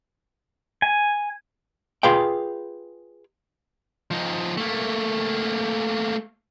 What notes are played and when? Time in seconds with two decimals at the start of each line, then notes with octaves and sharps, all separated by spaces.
0.82 G#5
2.03 F4 G#4 B4 F5 G5
4.11 F3 D#4
4.57 A3 A#3